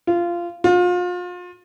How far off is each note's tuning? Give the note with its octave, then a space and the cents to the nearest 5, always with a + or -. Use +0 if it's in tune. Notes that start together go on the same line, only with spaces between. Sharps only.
F4 -15
F4 +35